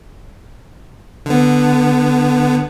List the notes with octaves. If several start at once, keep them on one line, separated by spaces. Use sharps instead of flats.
D3 B3